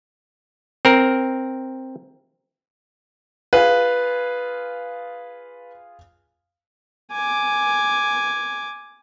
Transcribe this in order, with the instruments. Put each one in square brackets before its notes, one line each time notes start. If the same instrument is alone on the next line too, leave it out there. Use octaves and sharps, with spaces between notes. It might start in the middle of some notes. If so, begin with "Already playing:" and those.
[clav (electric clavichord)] C4 A#4
[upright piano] F4 G#4 F5 [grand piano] B4
[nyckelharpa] G#5 D6